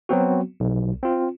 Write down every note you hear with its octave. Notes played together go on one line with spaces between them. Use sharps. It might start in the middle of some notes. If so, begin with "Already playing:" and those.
F#3 B3 C4 F#4
B1
C4 F4